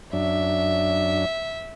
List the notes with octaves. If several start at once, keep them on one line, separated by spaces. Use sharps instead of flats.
F#2 D4 E5